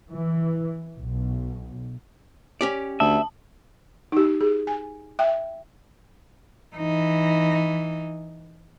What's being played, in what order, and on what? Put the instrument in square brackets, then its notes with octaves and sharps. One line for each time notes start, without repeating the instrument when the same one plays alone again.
[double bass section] E3
B1
[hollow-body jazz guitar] C#4 G4 D5
[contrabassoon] D2 [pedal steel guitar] E5 [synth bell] A5
[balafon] D#4 G4
G#4
G#5
E5 G5
[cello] E3 D#4